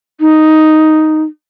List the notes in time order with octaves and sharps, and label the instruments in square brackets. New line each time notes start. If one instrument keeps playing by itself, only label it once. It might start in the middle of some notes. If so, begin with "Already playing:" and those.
[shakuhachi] D#4